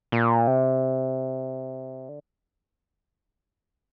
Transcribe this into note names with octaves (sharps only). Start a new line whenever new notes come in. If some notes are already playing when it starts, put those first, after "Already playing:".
A#2
C3
D3